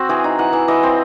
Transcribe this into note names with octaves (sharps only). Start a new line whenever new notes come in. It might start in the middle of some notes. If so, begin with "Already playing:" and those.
Already playing: C4 F#4
E3 G#4
D#4
E3 F#5
E3
E3 D#5
C4